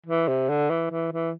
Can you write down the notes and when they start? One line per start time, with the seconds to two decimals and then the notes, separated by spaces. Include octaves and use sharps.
0.06 E3
0.28 C3
0.49 D3
0.70 E3
0.91 E3
1.13 E3